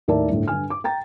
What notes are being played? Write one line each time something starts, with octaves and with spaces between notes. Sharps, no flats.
D#2 A2 A#4 D5 E5 A5
G1 A2
G2 D3 G#5 F6
D6
G5 A#5 A6